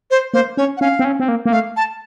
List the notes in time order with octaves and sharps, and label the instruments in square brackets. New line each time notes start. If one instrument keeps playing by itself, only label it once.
[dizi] C5
[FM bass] A#3 [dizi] C5
[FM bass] C#4 [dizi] C#5
[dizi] F#5
[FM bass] C#4 [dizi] F5
[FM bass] C4
C#4
C4
A#3
A#3
[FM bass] A3 [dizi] F5
[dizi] A5